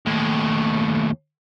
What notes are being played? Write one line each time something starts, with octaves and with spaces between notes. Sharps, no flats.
D#2 A2